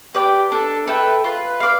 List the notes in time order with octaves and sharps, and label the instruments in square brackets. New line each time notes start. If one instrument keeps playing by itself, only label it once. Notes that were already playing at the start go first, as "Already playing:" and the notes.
[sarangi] G4 [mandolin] B4 D5 G5
[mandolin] D4 [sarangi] A4
[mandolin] A4 E5 G5 [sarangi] B4
[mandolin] F4 [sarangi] B4
[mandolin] B4 D5 F5